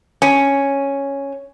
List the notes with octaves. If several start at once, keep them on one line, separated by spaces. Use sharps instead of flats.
C#4